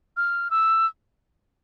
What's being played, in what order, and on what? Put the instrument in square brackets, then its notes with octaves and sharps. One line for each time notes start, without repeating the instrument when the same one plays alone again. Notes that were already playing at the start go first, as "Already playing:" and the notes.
[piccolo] F6
E6